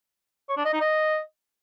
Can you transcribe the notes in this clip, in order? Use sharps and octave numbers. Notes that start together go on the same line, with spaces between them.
C#5
D4
D#5
D#4
D#5